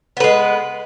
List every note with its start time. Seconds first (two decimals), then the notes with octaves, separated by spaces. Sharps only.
0.17 B3
0.20 B4
0.24 G#3